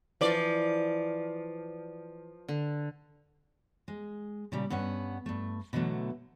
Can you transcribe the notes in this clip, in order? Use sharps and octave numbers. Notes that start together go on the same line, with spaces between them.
E3 F3 D5
D3
G#3
A#2 C#3 G3
G2 B3 C#4 F#5
G2 A3
B2 D3 E3 F#3 A3